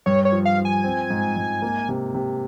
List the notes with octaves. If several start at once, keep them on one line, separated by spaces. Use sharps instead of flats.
G2 C#5
C#5
F3
F5
F3
G#5
C4
G#2
G#2
A#3
C3
C3